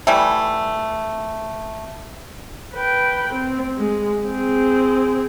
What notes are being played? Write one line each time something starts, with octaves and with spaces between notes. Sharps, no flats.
E3 G3 A3
B4 G5
C4
G#3
C4 G#4